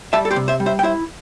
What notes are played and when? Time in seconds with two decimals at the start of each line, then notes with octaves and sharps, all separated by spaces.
0.13 G3 E5 A5
0.25 A4
0.31 G4 C5
0.36 C3
0.48 C5 E5
0.60 G3
0.66 C5 E5
0.79 G5
0.83 E4 C5 E5